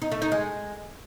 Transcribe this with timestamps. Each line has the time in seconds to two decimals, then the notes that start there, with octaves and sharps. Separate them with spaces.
0.02 D#4
0.12 A3
0.22 D#4
0.32 G#3